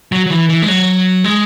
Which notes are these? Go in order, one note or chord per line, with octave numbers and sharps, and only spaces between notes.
F#3
F#3
E3
E3
G#3
F#3
G#3